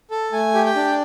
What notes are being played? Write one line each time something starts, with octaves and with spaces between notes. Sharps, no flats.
A4
A3 G#5
G4
G5
D4